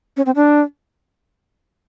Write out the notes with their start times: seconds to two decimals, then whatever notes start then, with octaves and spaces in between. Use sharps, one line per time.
0.17 C#4
0.26 C4
0.36 D4